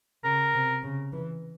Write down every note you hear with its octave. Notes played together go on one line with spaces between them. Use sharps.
C#3 A#4
C3
C#3
E3